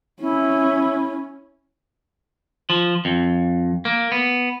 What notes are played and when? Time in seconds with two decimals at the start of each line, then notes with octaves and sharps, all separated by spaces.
0.21 C#4 E4
2.70 F3
3.05 F2
3.85 A#3
4.12 B3